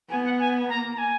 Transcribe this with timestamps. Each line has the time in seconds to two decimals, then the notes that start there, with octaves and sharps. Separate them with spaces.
0.10 B3 G#5
0.24 F#5
0.39 G#5
0.69 A#3 A#5
0.94 A#5
0.98 G#5